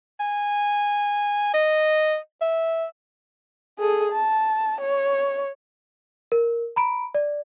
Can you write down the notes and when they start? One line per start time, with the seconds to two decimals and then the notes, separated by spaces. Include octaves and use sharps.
0.20 G#5
1.54 D#5
2.41 E5
3.79 G#4 A4
4.12 A5
4.81 C#5
6.32 A#4
6.76 A#5 B5 D7
7.15 D5